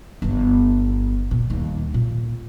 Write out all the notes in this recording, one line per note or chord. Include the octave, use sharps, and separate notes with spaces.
G1 B3
A#2
D#2 G3
A#2